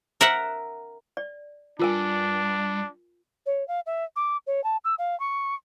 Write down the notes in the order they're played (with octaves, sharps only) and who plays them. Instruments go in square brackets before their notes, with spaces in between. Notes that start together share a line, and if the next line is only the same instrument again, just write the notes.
[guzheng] A#4 E5 F#5
[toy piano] D5
[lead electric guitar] E2 G2 [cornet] D4 [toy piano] F4 A#4 G#5
[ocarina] C#5
F5
E5
D6
C#5
A5
E6
F5
C#6